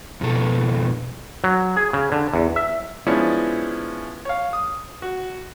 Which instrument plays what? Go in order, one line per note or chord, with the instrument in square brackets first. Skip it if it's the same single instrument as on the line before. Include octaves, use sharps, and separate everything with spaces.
[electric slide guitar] F2 B2 A4
[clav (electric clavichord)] F#3
G#4
C#3
D3
E2
E5
[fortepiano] F3 G#3 B3 C#4 D4 E4
C#5 F5
D#6
F#4